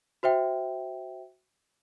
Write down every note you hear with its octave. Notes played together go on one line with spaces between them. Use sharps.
F#4 C5 E5 G5